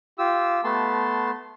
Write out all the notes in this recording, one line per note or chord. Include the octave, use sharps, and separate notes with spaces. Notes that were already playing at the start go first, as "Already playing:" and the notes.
F4 G4 E6
A3 B3 A5 C6